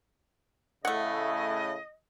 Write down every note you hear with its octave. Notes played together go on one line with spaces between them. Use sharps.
A2 C#3 A3 D#5 F#5